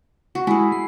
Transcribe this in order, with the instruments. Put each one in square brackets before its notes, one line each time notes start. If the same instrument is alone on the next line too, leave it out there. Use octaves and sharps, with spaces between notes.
[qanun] F#4
[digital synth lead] G#3 [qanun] E4 G#4
[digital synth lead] C7